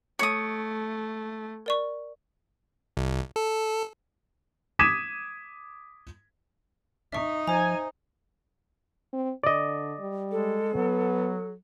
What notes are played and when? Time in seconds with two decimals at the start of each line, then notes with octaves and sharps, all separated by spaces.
0.19 A3 C#5 D#6
1.66 A#4 D5 C#6
2.97 C2
3.36 A4
4.79 D6 D#6 G#6 B6 D#7 E7
7.12 D#4 E5 C#6
7.47 F3 C5 G#5 A#5
9.13 C4
9.43 D3 D5 D#5
9.99 G3
10.32 G#3 A4
10.74 F#3 B3